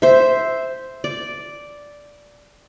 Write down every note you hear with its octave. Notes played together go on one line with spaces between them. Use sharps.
C5 E5
D5